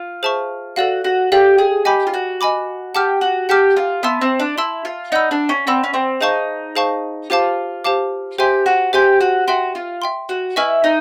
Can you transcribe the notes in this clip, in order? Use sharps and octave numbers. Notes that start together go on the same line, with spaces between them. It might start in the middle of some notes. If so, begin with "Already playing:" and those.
Already playing: F4
G#4 C5 E5 A5 C#6
F#4 A4 D5 F5
F#4
G4 A4 D5 F5
G#4
G4 D#5 G#5 B5 D6
F4
F#4
D#5 G#5 B5 D6
G4 F#5 A5 D6 F6
F#4
G4 F#5 A5 D6 F6
F4
B3 E5 A5 C6 E6
C4
D4
E4 E5 A5 C6 E6
F4
D#4 D5 F#5 B5 E6
D4
C#4
C4 D5 F#5 B5 E6
C#4
C4
D#4 G#4 C5 F5 A5 C#6
G#4 C5 F5 A5 C#6
F4 G4 C5 F5 A5 D6
G4 C5 F5 A5 D6
G4 C5 E5 G#5 C6
F#4
G4 C5 E5 G#5 C6
F#4
F#4 E5 G5 C6
F4
E5 G5 C6
F#4
E4 B4 D#5 G#5 C#6 F6
D#4